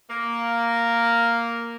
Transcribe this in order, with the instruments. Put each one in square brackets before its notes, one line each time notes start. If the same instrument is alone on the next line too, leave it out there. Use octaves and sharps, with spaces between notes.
[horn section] A#3